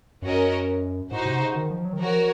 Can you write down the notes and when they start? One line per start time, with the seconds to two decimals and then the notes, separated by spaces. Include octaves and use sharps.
0.22 F#2 C#4 F#4 A#4 D#5
1.11 A2 D#4 F#4 C5
1.26 C3
1.41 C#3
1.55 D#3
1.70 F3
1.85 F#3
1.93 D#3
1.99 F3 F#4 A#4 C#5